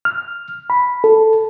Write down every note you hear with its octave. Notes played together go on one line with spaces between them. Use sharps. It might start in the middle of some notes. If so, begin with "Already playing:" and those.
F6
B5
A4